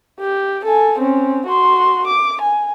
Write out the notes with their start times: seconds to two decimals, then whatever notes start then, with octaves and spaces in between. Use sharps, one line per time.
0.20 G4
0.64 A4 G#5
0.99 C4 C#4
1.46 F#4 C6
2.07 D6
2.41 G#5